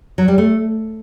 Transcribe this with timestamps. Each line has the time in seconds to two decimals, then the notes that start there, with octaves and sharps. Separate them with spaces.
0.18 F#3
0.28 G3
0.38 A3